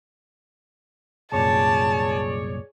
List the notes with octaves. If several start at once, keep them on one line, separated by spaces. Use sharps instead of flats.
C2 F#2 A#2 G#4 C#5 D5 A5